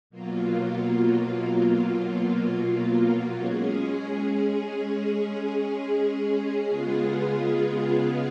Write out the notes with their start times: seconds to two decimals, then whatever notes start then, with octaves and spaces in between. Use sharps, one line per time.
0.10 B2 F#3 A#3 F4
3.37 G#3 C#4 G#4
6.66 C#3 G#3 B3 F4 G#4